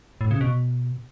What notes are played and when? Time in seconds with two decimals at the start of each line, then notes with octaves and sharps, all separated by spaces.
0.21 A2
0.31 C#3
0.41 B2